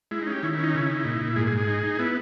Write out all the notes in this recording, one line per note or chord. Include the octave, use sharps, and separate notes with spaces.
G#3 E4
C#4 D#4
G4
D#3 E4
C#4 E4
D#4
C#3 E4
D#4
A#2
A#2
G#2 G#4
G#4
G#2
G#4
D#4
D#4
B3 E4